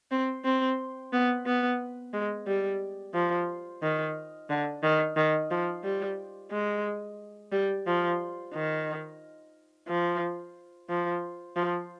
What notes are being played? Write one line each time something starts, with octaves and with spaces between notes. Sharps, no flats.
C4
C4
B3
B3
G#3
G3
F3
D#3
D3
D#3
D#3
F3
G3
G#3
G3
F3
D#3
F3
F3
F3